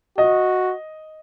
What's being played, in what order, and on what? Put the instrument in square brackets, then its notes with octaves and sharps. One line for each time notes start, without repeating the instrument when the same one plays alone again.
[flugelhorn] F#4 [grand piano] D#5